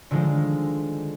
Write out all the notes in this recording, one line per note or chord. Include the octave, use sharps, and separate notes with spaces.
D3 D#3 F3 G#3